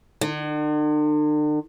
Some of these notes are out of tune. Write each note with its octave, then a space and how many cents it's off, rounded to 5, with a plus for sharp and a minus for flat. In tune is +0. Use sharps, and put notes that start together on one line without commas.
D3 +45